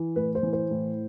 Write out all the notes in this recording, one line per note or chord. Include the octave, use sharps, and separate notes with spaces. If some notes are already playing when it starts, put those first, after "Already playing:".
Already playing: E3
A2 B4
C5
E3
C5
A2